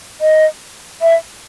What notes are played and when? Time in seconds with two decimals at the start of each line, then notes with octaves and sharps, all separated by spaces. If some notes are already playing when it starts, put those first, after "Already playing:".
0.20 D#5
1.01 E5